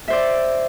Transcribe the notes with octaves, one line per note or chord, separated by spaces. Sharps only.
C5 D5 E5